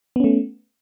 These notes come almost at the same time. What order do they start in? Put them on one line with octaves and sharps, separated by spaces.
B3 C#4 A3